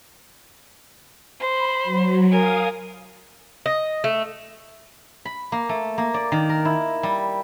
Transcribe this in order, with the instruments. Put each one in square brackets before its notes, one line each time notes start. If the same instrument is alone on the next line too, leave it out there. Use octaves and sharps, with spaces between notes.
[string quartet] C5 [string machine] B5
[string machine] F#3
[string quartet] A#4 G#5 [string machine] F5 D#6
[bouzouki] D#5
A3
[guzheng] B5
A#3
A3
A#3
D5
D#3
A#4
E4
G3